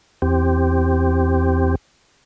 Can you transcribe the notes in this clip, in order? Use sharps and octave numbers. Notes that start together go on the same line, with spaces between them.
E2 C4 G4